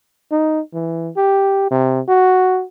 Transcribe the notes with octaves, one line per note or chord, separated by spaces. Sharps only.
D#4
E3
G4
C3
F#4